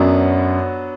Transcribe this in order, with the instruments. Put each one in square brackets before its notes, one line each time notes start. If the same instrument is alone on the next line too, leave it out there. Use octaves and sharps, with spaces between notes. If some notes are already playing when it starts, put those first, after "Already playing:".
Already playing: [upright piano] F#2 [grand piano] F#3 B3 D4